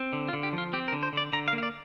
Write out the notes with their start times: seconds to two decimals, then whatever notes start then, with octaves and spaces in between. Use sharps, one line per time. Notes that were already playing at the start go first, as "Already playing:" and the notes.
Already playing: C4
0.13 D3
0.28 F4
0.33 D3
0.43 G4
0.53 F3
0.58 F4
0.73 C4 G4
0.88 A#4
0.92 D3
1.03 C5
1.13 D3 D5
1.33 D3 A#5
1.48 F5
1.53 A#3
1.58 F5
1.63 D5